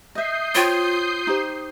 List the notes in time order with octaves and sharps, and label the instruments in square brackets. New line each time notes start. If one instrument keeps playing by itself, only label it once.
[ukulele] D#5 E5 [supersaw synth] D#6 G6 C7
[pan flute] F4 [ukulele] C5 C#5 G5
[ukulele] D#4 G4 C5